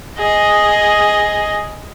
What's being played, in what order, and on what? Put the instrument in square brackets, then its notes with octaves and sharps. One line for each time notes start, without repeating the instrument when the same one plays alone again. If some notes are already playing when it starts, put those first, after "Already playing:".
[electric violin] G#4 [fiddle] D#5